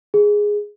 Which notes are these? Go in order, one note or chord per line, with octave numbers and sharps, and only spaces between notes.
G#4